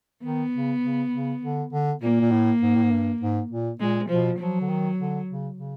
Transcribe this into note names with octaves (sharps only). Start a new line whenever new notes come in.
D#3 B3
C#3
C#3
C#3
D3
D3
A#2 A#3
A#2
A2
G#2
A2
G#2
G2
G#2
A#2
A#2 G#3
B2 F3
F3 F#3
D3
D#3
D3
C#3
C#3